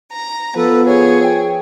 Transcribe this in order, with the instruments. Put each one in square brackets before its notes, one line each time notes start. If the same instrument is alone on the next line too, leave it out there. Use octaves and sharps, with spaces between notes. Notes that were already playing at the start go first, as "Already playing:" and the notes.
[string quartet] A#5
[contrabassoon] F3 [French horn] B3 [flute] A4 [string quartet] B4
[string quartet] G#4 [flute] C#5
[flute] G5